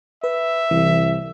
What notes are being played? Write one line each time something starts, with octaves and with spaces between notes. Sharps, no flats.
B4 E5
C2 E3